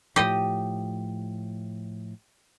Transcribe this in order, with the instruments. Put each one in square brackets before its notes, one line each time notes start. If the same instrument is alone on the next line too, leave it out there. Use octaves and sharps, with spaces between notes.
[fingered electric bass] A2 F3 [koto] G4 D#5